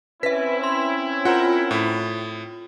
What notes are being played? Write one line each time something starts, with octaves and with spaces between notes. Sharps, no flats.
C4 C#4 E4 B4 E5 B6
C6
F4 A#4 C5 F#5
A2